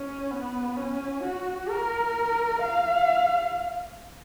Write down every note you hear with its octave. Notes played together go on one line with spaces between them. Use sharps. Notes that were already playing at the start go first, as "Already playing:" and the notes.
Already playing: C#4
B3
C#4
F#4
A#4
F5